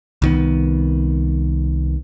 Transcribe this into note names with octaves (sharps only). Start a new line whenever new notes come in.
C2 D#3 B3